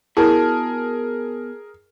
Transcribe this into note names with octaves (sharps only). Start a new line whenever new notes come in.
B2 E4 G#4 A#4 A5